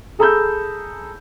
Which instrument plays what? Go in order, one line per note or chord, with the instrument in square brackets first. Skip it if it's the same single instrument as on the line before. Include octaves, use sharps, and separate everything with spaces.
[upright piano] G#4 A4 A#5 B5 E6 G6